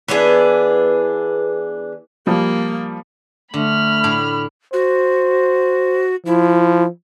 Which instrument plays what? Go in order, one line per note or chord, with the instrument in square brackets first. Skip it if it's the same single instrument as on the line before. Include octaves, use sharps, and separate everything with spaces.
[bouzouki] E3 B3 D4 G#4
[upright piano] F3 G3 [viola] A#3
[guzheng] D3 [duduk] A3 [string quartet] B5 F6
[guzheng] A2 D4
[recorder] F#4 [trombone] C5
[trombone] F3 [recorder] E4